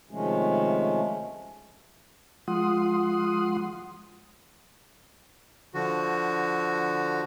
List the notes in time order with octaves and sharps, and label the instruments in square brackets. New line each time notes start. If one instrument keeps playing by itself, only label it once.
[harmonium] C3 D#3 F3 G#3 A3 C#4
[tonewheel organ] F3 G#3 F4 F#5 C6 D#6
[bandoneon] D3 F3 F#4